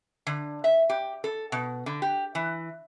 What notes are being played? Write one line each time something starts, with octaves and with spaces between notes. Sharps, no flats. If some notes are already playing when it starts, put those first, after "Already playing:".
D3
E5
G4
A4
B2
D3
G4
E3